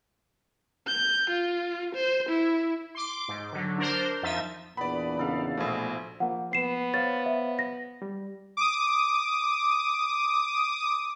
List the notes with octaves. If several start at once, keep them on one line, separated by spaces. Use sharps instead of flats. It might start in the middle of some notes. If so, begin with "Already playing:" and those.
G6
F4
C5
E4
C6 D6
G#2
D3 F#3
D4 A#4 C5
F2 F3 D#4 E5 A6
E2 A#2 B3 D4 D5 B5
C#3 D#4 A4 F5
A#1 B2 F3 A3 E4 G#4
F3 A#3 F#5
B3 C7 E7
C5 C#5 F5 A6
E5
A#6
G3
D6 D#6